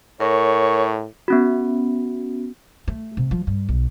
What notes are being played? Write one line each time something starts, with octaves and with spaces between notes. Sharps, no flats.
A2 A#4 C#5
B3 C#4 F#4
A3
C3
F3
G2
B1